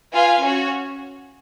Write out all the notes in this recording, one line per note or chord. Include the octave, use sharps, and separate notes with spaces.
F4 B4 F5 G#5
C#4 F#4 C#5